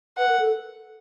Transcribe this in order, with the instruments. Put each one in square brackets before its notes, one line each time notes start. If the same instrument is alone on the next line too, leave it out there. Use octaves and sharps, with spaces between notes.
[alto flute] B4 [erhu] F#5
[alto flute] A#4
A4